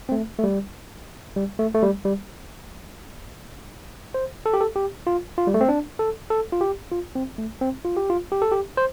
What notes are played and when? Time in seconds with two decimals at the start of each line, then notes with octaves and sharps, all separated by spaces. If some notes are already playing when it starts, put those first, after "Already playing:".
0.09 C4
0.12 A3
0.39 A3
0.44 G3
1.36 G3
1.59 A3
1.75 A3
1.82 G3
2.05 G3
4.14 C5
4.46 A4
4.54 G4
4.61 A4
4.76 G4
5.07 F4
5.38 F4
5.47 G3
5.54 A3
5.61 C4
5.69 D4
5.99 A4
6.30 A4
6.52 F4
6.61 G4
6.92 F4
7.15 C4
7.38 A3
7.61 C4
7.85 F4
7.97 G4
8.10 F4
8.32 G4
8.42 A4
8.52 G4
8.77 C5